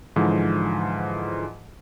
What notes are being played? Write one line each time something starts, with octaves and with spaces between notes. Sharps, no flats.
G#2 D3 E3 F3